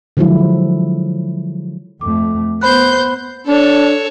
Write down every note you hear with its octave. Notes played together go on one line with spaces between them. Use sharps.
D3 F3 F#3 G#3 E4
F2 A3 D6
B3 C5 B5 F#6 G6
D4 A4 C#5